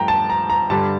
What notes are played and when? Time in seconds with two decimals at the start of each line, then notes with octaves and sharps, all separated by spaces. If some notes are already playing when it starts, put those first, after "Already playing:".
Already playing: G2 F3 A3 G5 A#5
0.08 A5
0.30 A#5
0.50 A#5
0.70 G2 D3 G3 A5